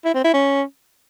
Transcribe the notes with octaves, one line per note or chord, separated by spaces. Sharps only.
E4
C4
E4
C#4